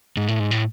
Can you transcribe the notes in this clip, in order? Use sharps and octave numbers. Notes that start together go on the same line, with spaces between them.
G#2
A2
G#2
A2